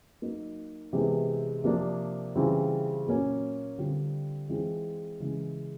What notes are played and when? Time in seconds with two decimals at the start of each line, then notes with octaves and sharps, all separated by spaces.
0.22 F#3 A#3 D#4
0.93 C3 E3 G#3 B3
1.64 C3 F3 A#3 D4
2.36 C#3 E3 G3 C4 F4
3.07 A#2 F#3 A#3 C#4
3.78 D3 G3 C4 F4
4.49 E3 G#3 C4 F4
5.20 C#3 E3 G#3